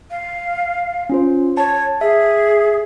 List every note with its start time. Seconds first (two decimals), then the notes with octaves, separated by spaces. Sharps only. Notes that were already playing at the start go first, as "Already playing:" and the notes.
0.11 F5
1.09 C#4 F4 C5
1.57 C#5 A5
2.01 G#4 E5